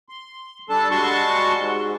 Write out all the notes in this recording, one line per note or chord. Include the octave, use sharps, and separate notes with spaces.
C6
G3 D4 A4 A5
G3 G#3 F#4 A5 C6 C#6
G#2